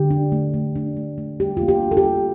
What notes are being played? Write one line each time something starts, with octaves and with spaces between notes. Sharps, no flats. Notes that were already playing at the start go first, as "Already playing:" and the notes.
Already playing: D3 G4
D4
A3
A3
D4
A3
A3
G3 G4
A#3 F4
G4
D4
A4
G4
F4